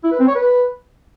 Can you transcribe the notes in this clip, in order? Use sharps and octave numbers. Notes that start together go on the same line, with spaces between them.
E4
B4
C4
C#5
B4